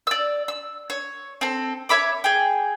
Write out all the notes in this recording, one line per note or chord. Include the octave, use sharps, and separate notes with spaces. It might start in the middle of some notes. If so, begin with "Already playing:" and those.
D5 E6
E6
C#5
C4 A4
C#5 E5 B5 D6
G#4 G5